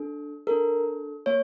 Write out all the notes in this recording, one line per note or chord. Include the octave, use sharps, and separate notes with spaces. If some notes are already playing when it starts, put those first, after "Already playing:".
Already playing: D4 A4
D4 A4 A#4
A#3 C#5